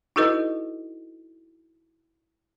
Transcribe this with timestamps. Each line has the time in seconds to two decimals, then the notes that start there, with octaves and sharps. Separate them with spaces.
0.16 D#4 E4 F#4 A4 B4 D#5